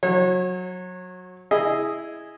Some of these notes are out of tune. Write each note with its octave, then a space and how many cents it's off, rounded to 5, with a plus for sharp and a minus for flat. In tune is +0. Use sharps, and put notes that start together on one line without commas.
F#3 -15 C#5 -35
E4 +0 G#4 +0 D#5 +0